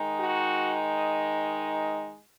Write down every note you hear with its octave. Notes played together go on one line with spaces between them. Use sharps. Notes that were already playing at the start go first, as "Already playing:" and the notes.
Already playing: D#3 G#3 D#4
F#4